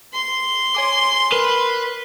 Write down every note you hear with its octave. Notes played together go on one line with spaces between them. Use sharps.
C6
C#5 G#5 D6
A#4 B4